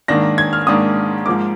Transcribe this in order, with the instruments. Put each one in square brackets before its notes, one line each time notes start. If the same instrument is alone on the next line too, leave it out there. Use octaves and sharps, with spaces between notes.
[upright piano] G#2 D#3 A#3 D4 A#6
G#6
F6
G#2 D#3 A#3 D4 D#6
G#2 F3 A#3 D6